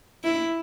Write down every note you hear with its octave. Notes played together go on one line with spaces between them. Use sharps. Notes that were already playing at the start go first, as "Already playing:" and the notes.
E4